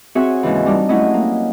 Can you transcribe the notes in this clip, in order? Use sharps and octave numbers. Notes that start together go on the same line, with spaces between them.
C4 F#4 G#4 C#5 E5 G#5
D#2 G#2 C#3 E3
G3 D4 D#4
F#3 A3 C#4 E4 D#5
A#3